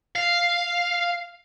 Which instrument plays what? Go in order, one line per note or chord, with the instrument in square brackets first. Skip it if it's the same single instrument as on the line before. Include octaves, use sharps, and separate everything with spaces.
[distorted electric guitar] F5